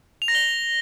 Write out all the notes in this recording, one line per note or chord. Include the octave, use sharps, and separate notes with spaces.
F7
A#6
G7